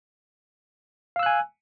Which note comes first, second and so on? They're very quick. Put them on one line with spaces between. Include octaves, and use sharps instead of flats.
F5 E6 F#6 G#5